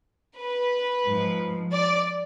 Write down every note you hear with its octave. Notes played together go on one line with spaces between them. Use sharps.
B4
G#2 F3
D5